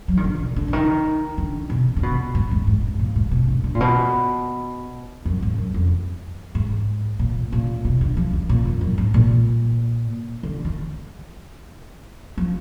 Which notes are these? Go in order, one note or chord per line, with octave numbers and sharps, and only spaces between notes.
F#3
D#3
D3
B2
D3
D3
D#3
D3
B2
D3
B2
G#2
G#2
G#2
G#2
A#2
G#2
B2
D3
D3
A#2
B2
F#2
G#2
F#2
F2
G#2
A#2
A#2
B2
D3
F3
D#3
A#2
F#2
F#2
G#2
A#2
D3
D#3
F3